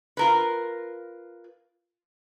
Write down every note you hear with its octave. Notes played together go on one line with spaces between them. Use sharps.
F4 A#4 B4